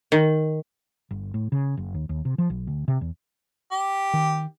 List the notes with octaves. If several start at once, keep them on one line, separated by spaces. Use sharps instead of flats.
D#3
G1
A2
C#3
F#1
D#2
D#2
C3
F3
B1
D2
C3
E2
G4
D#3